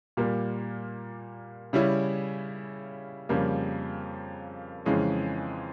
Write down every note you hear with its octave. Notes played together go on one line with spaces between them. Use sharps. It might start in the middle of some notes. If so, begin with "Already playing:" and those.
A#2 G3 A#3
C#3 G3 C#4 E4
F2 C#3 G3 A#3
F2 C#3 E3 G#3 C#4